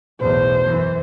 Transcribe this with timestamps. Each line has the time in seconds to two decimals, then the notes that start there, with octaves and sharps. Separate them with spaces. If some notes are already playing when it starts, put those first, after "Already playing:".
0.20 B1 E2 A2 C5
0.64 F#2 E3